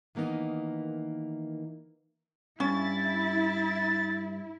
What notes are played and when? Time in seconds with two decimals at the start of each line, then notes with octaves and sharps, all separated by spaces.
0.15 D#3 E3 A#3 B3 D#4
2.60 G2 C#4 E4 A6